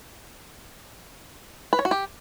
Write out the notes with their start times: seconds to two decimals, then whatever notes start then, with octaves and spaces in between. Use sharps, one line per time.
1.73 B4
1.79 C#5
1.85 F#4
1.91 G4